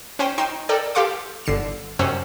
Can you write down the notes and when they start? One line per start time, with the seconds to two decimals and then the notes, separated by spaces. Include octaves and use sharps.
0.19 C#4 C5 G5
0.38 D#4 G5 C6 C7 E7
0.69 A4 A#4 D5 G5
0.95 G4 A4 F5 C6 D6
1.46 G1 D3 C7 E7
1.99 F#2 C3 C#4 C5 F#5 E6